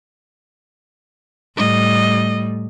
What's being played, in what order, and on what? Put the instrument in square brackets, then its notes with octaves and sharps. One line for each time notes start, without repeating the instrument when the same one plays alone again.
[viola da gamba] A2 G3 [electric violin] D#5